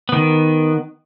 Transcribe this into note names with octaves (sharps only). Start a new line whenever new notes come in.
D#3 B3